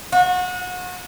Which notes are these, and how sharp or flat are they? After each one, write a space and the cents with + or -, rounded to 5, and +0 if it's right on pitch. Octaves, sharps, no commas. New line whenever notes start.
F#4 -30